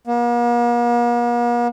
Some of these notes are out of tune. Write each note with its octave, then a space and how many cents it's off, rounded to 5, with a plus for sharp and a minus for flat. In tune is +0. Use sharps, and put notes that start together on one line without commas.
A#3 +45